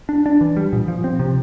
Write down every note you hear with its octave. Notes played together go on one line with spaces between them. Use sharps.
D4
D4
E3
G3
A#2
F3
C4
C3